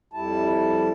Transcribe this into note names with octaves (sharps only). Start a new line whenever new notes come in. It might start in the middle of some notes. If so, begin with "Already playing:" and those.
F2 G3 E4 A5